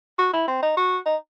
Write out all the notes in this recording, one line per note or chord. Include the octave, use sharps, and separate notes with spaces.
F#4
E4
C4
D#4
F#4
D#4